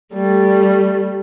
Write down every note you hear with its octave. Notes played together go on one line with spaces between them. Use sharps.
G3 A3